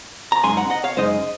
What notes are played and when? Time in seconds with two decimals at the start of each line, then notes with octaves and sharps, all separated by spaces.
0.32 A#5
0.44 F#2 C#3 G#3 D#4 G#5 C6
0.57 F#5 A#5
0.70 D#5 F#5
0.84 C#5 F5
0.97 F#2 C#3 G#3 D#4 C5 D#5